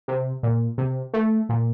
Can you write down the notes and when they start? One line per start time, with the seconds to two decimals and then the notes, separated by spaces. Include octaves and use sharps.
0.08 C3
0.43 A#2
0.78 C3
1.14 A3
1.49 A#2